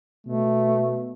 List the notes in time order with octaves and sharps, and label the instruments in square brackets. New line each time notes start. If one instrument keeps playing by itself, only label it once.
[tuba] B2 [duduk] A3